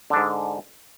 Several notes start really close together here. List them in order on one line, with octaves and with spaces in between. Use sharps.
D3 D4 G#2